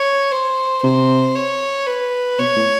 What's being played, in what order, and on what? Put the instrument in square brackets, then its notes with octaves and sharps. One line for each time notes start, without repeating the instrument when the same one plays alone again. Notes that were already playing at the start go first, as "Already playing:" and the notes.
Already playing: [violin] C#5
C5
[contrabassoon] C3 [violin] C5
[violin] C#5
B4
[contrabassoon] B2 [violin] C#5
[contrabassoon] A2